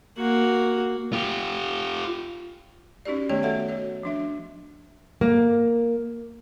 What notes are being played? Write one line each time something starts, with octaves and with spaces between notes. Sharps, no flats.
A#3 F#4
F4 G4
C#4 D#4 F#4 G4 D5
D#3 A3 B3 F#4 C#5 D#5
F#4 A4 D#5 E5 F#5
F#4 C#5
F3 D4 E5
A#3